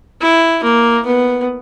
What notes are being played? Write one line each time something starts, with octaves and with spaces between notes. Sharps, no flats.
E4
A#3
B3